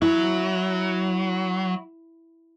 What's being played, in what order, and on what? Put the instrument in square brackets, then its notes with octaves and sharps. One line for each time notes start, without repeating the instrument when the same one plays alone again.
[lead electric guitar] F#3 [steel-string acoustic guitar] E4